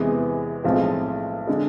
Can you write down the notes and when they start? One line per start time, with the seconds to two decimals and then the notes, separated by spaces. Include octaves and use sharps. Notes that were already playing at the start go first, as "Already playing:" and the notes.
Already playing: E2 C3 E3 G#3 B3
0.64 B1 A2 F3 G#3 C4
1.47 D3 G#3